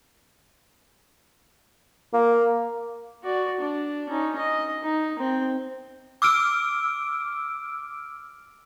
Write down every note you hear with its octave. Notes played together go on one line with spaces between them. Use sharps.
A#3
F#4 D5
D4
C#4 D#4
D#5
D#4
C4
D6 E6 F6 D7